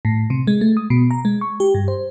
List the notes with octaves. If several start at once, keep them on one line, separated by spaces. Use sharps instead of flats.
A2
C3
G#3
A3
D#6
B2
A#5
G#3
C#6
G4
G2
C5